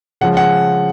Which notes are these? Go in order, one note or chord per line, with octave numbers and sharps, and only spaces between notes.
C#3 F3 G#3 F#5
F#5